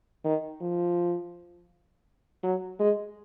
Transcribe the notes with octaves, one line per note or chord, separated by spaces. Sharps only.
D#3
F3
F#3
G#3